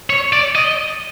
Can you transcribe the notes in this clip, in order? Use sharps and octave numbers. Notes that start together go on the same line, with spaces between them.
C#5
D5
D#5